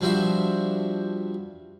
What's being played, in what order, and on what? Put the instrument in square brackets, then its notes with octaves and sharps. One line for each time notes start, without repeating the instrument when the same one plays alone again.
[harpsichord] G2 F3 D4 F#4 E5 C6